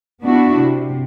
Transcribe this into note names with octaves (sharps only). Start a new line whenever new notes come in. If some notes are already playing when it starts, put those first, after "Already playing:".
B3 D4 E4 F#4
C3